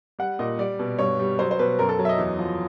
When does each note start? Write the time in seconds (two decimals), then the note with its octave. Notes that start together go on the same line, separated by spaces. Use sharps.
0.19 G3 F#5
0.39 A#2 D#5
0.59 G3 D5
0.79 B2
0.99 G2 C#5
1.19 G3
1.39 F#3 C5
1.51 C5
1.59 B2 B4
1.79 F#2 A#4
1.89 A4
1.99 F#3
2.05 E5
2.09 D#5
2.19 E2
2.39 F3